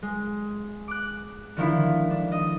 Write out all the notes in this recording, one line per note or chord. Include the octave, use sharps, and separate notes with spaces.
G#3
D6 F#6
D3 D#3 F3 E4
D4
D#5